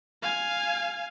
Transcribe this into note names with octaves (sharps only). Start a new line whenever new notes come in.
F5 G#5